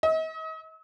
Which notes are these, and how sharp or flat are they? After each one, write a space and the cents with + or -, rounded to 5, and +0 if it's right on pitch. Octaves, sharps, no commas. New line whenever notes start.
D#5 +40 E6 -45